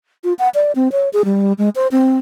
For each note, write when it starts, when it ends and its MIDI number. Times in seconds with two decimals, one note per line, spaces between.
0.24 0.33 65
0.39 0.49 78
0.54 0.72 74
0.75 0.91 60
0.92 1.09 73
1.13 1.23 68
1.25 1.53 55
1.58 1.69 56
1.75 1.88 72
1.92 2.19 60